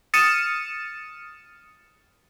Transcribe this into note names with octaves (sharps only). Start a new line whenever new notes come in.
D#6 F6 A6 C#7 D#7 E7